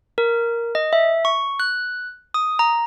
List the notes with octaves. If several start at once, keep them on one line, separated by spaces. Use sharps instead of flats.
A#4
D#5
E5
C#6
F#6
D#6
A#5